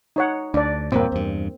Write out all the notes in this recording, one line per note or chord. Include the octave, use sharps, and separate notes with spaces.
D#4 C#5 F#5
D2 D4 D5
E2 G2 A#2 A#3 C4
E2 G2